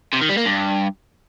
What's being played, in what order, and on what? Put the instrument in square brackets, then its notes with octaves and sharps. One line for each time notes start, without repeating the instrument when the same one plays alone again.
[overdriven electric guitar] C3
D#3
G3
A#3
G2